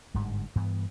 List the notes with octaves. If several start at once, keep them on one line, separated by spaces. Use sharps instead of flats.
G1 G#2 D3 G3
G2 E3 B3